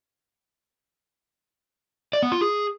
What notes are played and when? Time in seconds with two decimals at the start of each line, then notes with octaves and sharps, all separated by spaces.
2.13 D5
2.23 B3
2.32 F4
2.41 G#4